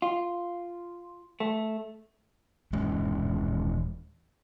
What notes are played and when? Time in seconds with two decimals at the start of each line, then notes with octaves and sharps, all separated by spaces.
0.02 F4
1.40 A3
2.72 D#1 E3 G#3 C#4